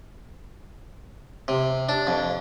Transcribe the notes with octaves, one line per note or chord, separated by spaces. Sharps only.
C3
D4
F2